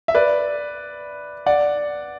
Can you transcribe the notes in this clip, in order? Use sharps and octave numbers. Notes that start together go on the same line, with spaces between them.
E5
B4 D5
D5 F#5